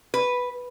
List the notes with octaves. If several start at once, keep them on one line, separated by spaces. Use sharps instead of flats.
B4